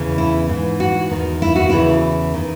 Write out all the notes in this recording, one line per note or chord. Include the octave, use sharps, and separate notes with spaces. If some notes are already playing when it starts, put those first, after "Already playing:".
Already playing: E2 C#3 E3
E4
G#2 E3
F#4
E2 D#3
E4
F#4
E2 C#3 E3 E4
D#3